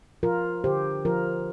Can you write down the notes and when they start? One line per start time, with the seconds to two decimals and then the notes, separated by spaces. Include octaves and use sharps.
0.23 F3 F4 A#4
0.64 D3 G4 C5
1.05 F3 F4 A#4